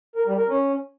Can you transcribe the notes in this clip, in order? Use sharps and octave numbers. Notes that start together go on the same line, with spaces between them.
A#4
G3
A#4
C#4